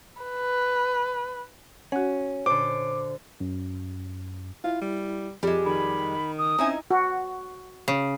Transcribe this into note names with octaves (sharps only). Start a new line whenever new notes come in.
B4
C#4 F#4 F#5
A#2 D3 C5 D6
F#2
E4 F4
G3
F2 G3 G#3
D#3 B5
C#2 D#6
C4 C#4 D#4 E4 G#5
F#4
C#3